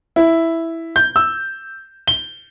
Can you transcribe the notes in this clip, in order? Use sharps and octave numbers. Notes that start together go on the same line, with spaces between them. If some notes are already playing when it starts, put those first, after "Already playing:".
E4
G6
E6
G7